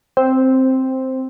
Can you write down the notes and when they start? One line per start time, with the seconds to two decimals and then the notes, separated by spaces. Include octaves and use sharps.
0.17 C4